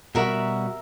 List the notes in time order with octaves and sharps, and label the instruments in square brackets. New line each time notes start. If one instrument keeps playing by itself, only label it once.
[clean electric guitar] B2 G3 F#4 [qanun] A#4 E5